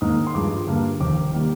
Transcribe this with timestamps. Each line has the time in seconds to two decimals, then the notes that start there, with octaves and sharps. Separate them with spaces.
0.01 G#2 D#3 A#3 D#4 D#6
0.27 C6
0.34 G2 F3 G#3 D6
0.67 G2 D3 G3 A#3
1.00 F1 D#2 D#3 D6
1.33 D#3 G3 A#3